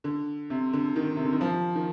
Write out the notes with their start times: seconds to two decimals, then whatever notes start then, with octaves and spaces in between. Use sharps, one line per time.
0.04 D3
0.50 C3
0.73 D3
0.96 D#3
1.16 C3
1.25 D3
1.32 D#3
1.41 F3
1.75 D#3